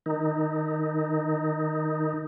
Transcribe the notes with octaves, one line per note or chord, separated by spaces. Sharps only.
D#3 D#4